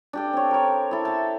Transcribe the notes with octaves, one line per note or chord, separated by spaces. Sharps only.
D4 G4 A4
C4 C#5
A#4 C#5
E4 A4
E5 A5